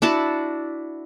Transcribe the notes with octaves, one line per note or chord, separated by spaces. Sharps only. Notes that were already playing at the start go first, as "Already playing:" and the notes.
D4 E4 F#4 A5